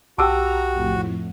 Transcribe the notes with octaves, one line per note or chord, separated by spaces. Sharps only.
B1 F#4 G4 G5 A5 A#5 D6 E6
F2 A2